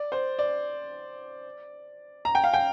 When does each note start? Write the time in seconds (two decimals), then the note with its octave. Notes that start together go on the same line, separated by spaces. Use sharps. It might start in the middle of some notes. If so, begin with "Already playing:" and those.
Already playing: D5
0.12 C5
0.39 D5
2.25 A#5
2.35 G5
2.44 F5
2.54 G5